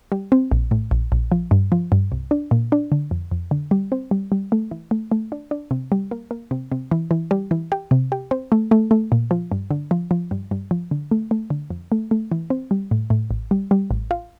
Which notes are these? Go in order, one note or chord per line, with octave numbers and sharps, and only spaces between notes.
G3
C4
A#1
A2
A#1
A#1
F3
G2
F3
G2
C2
D4
A#2
D4
D3
F2
F2
D3
G3
C4
G3
G3
A3
E3
A3
A3
D4
D4
C3
G3
A#3
A#3
C3
C3
E3
E3
G3
E3
G4
C3
G4
C4
A3
A3
A3
A#2
F3
G2
D3
F3
F3
G2
G2
F3
D3
A3
A3
D3
F2
A3
A3
E3
C4
G3
A2
A2
A1
G3
G3
A1
F4